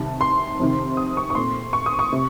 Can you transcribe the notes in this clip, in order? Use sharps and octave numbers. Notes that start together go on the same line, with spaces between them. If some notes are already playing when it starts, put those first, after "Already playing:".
Already playing: C2 C3 D#3 A5
C6
F2 C3 D#3
D#6
C#6
C#6
A#2 A3 C4 C6
C#6
D#6
C#6
C3